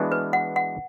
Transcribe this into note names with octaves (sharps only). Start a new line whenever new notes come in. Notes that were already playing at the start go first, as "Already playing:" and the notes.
Already playing: E3 G#3 B3 D4 F#4
B4
F#5
F#5